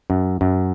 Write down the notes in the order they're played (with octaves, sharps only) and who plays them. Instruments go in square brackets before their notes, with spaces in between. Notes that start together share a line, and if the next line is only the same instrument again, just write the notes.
[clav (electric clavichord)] F#2
F#2